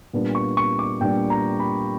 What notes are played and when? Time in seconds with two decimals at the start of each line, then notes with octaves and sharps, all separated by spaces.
0.13 A#2 G3 B3 D4
0.35 C#6
0.57 C#6
0.79 D6
1.01 A#2 G3 B3 D4 G5
1.30 A#5
1.60 B5